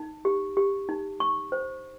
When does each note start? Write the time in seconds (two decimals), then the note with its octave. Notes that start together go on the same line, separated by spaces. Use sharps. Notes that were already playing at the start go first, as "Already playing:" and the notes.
Already playing: D#4
0.25 G4
0.57 G4
0.89 D#4
1.20 C#6
1.52 C5